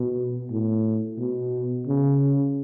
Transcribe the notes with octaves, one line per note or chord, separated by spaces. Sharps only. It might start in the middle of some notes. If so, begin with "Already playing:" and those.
Already playing: B2
A2
B2
C#3